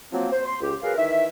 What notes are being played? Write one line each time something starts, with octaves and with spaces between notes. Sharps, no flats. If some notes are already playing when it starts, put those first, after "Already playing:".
F3 F#3 A#3 C4
C5
C6
C#2 G4
F#3 G#4 A#4 B4 F5
D#3 E3 E5